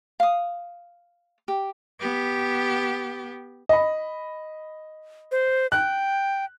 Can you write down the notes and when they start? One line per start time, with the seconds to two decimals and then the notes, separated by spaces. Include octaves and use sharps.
0.20 F5 D#6
1.48 G4
2.00 B3 G4
3.69 D#5 B5
5.32 C5
5.72 G5 F#6